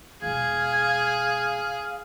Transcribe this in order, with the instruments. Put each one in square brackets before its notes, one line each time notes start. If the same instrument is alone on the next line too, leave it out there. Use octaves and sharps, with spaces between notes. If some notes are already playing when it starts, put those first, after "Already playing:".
[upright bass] E1 B2 [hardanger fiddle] G#4 [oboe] F5 [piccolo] G#6